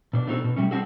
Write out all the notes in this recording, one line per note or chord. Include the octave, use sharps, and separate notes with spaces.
B2 D4
A3 B3 C4 D#4 F#4 A4
B2
G3 A3 C#4
C4 D4 F#4 G#4 A4